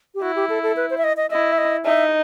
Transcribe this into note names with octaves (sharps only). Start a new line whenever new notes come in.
G4
E4 F#4
G4
A4
A4
B4
C5
E5
D#5
D#5
E4 D#5
E5
D#5
D#4 E5